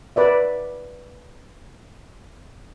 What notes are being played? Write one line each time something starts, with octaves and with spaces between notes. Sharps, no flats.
B4 D5 E5